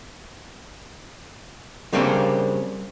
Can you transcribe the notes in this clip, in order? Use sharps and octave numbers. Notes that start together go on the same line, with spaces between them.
C#3 G3 A#3 C4 D4 A4